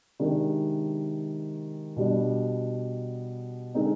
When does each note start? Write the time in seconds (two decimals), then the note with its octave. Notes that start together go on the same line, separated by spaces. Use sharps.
0.20 C3 D#3 G#3 D4
1.96 B2 G3 D4
3.74 D3 G#3 C4 D#4